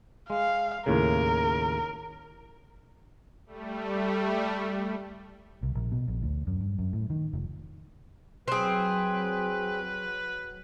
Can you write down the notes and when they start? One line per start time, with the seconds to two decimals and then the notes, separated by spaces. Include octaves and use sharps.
0.30 G#3 F5
0.86 D#2 A2 C#3 A#4
3.46 G3 A3
5.63 C2
5.75 A#1
5.92 B2
6.08 A#1
6.23 D2
6.47 F#2
6.61 G2
6.79 F#2
6.93 A2
7.10 D#3
7.33 F1
8.48 F#3 C4 G#4 B4